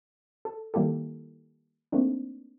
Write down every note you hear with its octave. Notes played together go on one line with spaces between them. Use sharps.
A4
D#3 G3 A#3 E4 G4 A4
A3 A#3 C4 D4 D#4